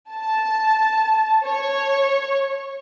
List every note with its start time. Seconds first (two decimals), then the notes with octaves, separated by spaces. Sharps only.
0.11 A5
1.45 C#5